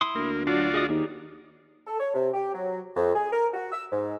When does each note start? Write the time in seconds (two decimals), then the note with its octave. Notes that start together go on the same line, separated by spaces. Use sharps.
0.01 E4 C6 D#6
0.15 D2 A#3
0.47 F#3 D4 F4 F#4 D5
0.74 G#4 D#5 D#6
0.89 D#2 D#4 G4 G#4
1.86 A4
1.99 C#5
2.14 C3
2.34 G4
2.54 F#3
2.96 F2
3.15 G#4
3.32 A#4
3.54 F#4
3.72 E6
3.92 G#2